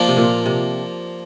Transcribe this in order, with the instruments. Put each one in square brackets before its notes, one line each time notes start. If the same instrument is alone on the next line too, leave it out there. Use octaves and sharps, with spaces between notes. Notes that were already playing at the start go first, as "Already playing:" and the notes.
Already playing: [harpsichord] F3 A#3 D4 F4
[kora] C3
A#2
C3